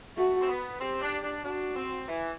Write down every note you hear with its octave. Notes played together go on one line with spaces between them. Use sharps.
A3 F#4
C4
B3
C4 G4
D4
D4
D4 F#4
C4
E3